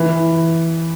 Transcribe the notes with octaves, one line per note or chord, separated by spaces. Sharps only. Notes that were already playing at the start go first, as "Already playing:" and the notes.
Already playing: E3